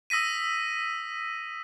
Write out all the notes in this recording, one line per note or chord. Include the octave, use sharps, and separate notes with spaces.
D#6 E6 A#6 B6 D#7